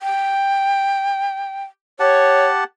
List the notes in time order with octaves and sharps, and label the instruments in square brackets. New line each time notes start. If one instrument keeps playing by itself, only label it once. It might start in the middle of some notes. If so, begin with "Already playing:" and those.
[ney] G5
[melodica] G4 F#5 A5 [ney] C#5